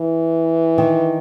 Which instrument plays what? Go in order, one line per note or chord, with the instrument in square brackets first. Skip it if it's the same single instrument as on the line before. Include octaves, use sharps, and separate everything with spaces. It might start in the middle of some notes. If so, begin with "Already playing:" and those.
Already playing: [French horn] E3
[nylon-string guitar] D#3